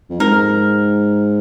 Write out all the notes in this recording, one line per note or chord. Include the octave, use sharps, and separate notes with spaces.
F2
G#2 A#4